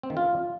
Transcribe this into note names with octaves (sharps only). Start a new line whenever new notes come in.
C4
D#3
F4